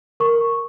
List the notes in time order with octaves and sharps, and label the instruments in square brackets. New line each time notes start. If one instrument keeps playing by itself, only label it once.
[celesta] A#4 C#6